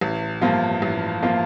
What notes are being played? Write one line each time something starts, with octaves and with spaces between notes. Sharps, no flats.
A1
G2 F3 A#3 F4
A1
F3 A#3 F4